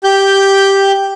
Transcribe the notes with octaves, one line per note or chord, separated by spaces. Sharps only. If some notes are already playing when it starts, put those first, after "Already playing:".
G4 G6